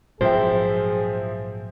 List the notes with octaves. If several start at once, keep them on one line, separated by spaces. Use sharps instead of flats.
A#1 G#2 F3 F#3 C4 G#4 C5 E5